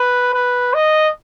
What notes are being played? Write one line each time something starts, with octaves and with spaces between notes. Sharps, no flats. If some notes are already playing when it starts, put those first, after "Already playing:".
Already playing: B4
B4
D#5